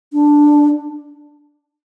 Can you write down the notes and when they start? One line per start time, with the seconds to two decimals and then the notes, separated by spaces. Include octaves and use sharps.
0.13 D4